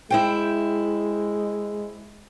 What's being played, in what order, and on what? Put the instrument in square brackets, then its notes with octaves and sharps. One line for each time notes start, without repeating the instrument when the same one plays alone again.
[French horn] G#3 [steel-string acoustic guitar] E4 C5 G5